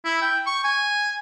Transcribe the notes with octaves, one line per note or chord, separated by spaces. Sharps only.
E4
G5
C#6
G#5